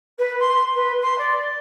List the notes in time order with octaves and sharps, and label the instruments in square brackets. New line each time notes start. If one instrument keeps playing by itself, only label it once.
[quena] B4
C6
B4
C6
D5